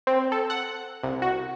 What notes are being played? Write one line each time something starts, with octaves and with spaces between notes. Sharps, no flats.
C4
A4
F#5
C2
F#4